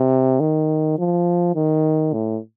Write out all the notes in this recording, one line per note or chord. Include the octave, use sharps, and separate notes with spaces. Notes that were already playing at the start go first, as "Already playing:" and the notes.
Already playing: C3
D#3
F3
D#3
A2